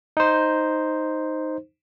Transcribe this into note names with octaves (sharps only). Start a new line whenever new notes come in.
D#4 C5